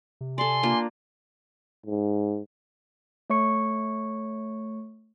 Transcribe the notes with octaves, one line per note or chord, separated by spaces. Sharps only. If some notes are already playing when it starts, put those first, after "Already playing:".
C3
A4 D5 G#5 C6
A#3 D4 F4
G#2
A3 C#5 C#6 C#7